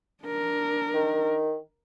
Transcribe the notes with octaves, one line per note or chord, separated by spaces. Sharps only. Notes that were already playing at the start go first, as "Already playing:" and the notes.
D4 A#4
D#3